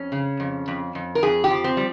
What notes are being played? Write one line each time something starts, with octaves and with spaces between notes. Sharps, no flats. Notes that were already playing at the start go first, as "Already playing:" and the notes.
Already playing: F2 C#4
C#3
F2
F2
F2
A#4
F2 G#4
G4
F3
C4
G3